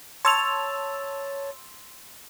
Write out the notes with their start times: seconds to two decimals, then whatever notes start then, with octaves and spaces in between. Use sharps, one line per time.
0.25 C#5 A5 C6 E6 F7